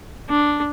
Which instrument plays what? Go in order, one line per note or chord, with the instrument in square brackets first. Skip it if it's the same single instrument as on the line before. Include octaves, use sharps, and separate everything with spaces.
[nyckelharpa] D4